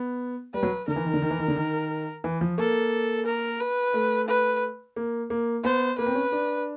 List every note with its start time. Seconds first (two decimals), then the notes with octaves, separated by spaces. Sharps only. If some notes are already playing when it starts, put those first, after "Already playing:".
Already playing: B3
0.54 G3 B4
0.63 F#3
0.88 D3 A#4
0.96 E3
1.05 D#3
1.14 D3
1.22 D#3
1.31 E3
1.39 D#3
1.48 D3
1.56 D#3
2.24 E3
2.41 F3
2.58 A#3 A4
3.26 A#4
3.60 B4
3.94 A3
4.28 B4
4.96 A#3
5.30 A#3
5.64 B3 C5
5.98 A#3 B4
6.06 C4
6.15 C#4
6.32 D4